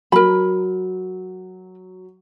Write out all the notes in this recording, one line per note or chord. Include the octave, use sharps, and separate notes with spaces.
F#3 A#4 B5